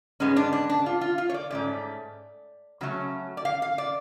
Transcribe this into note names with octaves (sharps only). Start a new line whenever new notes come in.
G#2 G#3 B3 C#4
D4
D4
D4
F4
F4
F4
C#5
D5
G#2 F3 A3 C#4 D5
C#3 F#3 A3 C#4
D5
F5
F5
D5